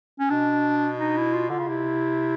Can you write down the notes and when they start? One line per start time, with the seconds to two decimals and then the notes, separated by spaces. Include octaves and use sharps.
0.19 C#4
0.30 B2 D4
0.99 D#4
1.17 E4
1.34 F4
1.49 D3 F4
1.59 C#3
1.68 C3 E4